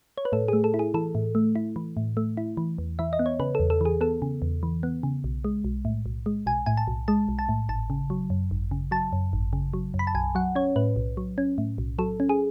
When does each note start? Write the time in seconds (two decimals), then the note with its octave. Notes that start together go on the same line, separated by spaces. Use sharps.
0.18 C#5
0.25 B4
0.32 A2 A4
0.48 A3 G#4
0.64 A4
0.74 E4
0.79 G#4
0.94 E3 A4
1.15 A2
1.35 A3
1.56 E4
1.76 E3
1.97 A2
2.17 A3
2.37 E4
2.57 E3
2.78 E2
2.99 E3 E5
3.13 D#5
3.19 B3
3.26 C#5
3.40 C#3 B4
3.55 E2 A4
3.70 A4
3.81 E3 G#4
4.01 B3 A4
4.22 C#3
4.42 E2
4.63 E3
4.83 B3
5.03 C#3
5.24 B1
5.45 G#3
5.64 B1
5.85 A2
6.06 B1
6.26 G#3
6.46 B1 G#5
6.66 A2 G#5
6.77 A5
6.88 B1
7.08 G#3 A5
7.28 B1
7.39 A5
7.49 A2
7.69 G#1 A5
7.90 C#3
8.10 F#3
8.30 F#2
8.51 G#1
8.71 C#3
8.91 F#3 A5
9.13 F#2
9.33 G#1
9.53 C#3
9.74 F#3
9.94 F#2
9.99 B5
10.07 A5
10.15 B1 G#5
10.35 F#3 F#5
10.55 C#4 C#5
10.76 A2 B4
10.96 B1
11.17 F#3
11.38 C#4
11.58 A2
11.78 B1
11.98 F#3 A4
12.20 C#4
12.29 G#4